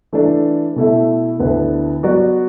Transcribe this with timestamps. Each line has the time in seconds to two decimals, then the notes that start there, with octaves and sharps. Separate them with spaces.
0.13 E3 A3 D4
0.76 B2 A3 E4
1.39 D2 D3 B3 E4 B4
2.03 F#3 B3 F#4 D5